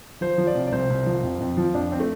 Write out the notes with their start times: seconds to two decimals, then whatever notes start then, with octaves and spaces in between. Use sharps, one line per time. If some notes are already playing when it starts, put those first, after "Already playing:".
0.21 F3 C5
0.38 F3
0.47 D5
0.55 C3
0.67 D5
0.72 C2 C5
0.90 C2
1.06 F3
1.23 F2
1.41 F2
1.57 F3
1.74 F2 D4
1.92 C4
2.00 A3